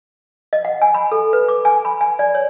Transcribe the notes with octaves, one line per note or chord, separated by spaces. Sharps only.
D#5
F#5
G#5
B5
A4
B4
D6
G#5
B5
G#5
D5
C#5